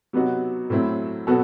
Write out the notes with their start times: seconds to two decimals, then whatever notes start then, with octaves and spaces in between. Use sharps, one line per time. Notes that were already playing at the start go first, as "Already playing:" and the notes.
0.13 C3 F#3 B3 D#4 F#4
0.70 A2 F#3 C4 E4
1.27 B2 F#3 B3 F#4 A4